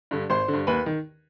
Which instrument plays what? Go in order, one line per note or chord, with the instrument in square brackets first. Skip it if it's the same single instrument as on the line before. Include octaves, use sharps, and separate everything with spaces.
[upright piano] G2 D3
G#1 C5 C6
D3
G2
D#2 B4 B5
D#3